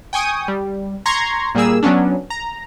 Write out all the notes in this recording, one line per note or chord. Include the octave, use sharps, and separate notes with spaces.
G5 G#5 C#6 D#6
G3
A#5 C6 C#6 G#6 A#6 C7
A#2 G3 A#3 G#4 E6
F#3 B3 C#4 D4
A#5